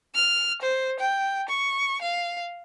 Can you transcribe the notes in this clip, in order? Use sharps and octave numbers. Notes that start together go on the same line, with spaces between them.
F6
C5
G5
C#6
F5